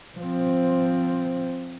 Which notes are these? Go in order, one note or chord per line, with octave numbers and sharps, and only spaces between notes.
F3 C4